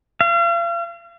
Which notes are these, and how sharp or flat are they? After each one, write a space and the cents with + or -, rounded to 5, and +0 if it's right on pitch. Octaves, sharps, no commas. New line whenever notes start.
F5 -40